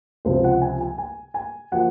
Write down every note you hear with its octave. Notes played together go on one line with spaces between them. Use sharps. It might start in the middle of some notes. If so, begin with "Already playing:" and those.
C#2 C3 F3 C5
F#5
G#5
G#5
G#5
G#5
F3 A#3 F#5